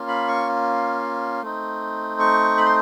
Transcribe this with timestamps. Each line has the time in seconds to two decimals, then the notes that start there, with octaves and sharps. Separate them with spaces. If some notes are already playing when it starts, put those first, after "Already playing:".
Already playing: A#3 C#4 F4
0.08 B5
0.28 C#6
1.42 A3 C4 D#4
2.19 C#6
2.57 B5
2.66 C6